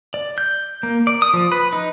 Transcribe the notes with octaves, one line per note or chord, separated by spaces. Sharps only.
D5
G6
A#3
D5
D#6
F3
B4
D#4